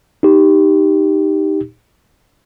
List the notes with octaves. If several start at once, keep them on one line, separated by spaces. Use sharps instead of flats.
D#4 G4